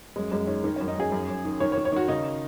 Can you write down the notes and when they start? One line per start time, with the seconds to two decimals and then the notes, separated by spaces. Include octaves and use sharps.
0.16 F#2 G#3
0.31 F#2 G#3
0.47 D#3 C#4
0.64 D#3 C#4
0.76 F#2 C#4
0.88 D#4
0.97 F#2 G#4
1.12 F#2
1.29 F#2
1.45 D#3
1.60 D#3 C#5
1.72 C#5
1.77 D#3
1.85 C#5
1.92 D#3 F#4
2.08 C#3 D#4